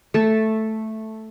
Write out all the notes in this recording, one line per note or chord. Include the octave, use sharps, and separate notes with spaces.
A3 A5